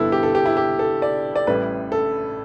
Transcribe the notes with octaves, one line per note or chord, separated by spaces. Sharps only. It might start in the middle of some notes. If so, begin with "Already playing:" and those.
Already playing: G1 G2 D3 G3 B3 E4 A4
G4
A4
G4
E4
G4
A4
D5
D5
A1 A2 G3 B4
A4